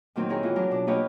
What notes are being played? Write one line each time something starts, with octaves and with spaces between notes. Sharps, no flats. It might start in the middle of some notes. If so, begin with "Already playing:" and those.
A#2 D#3 F#3 A#3 C4
E4 G4 G#4 A#4 C#5 D#5
E3 B3 C#4 F4 F#4
F#3 D4 A#4
B2 D4
A#3 F4 G4 B4 C#5 D#5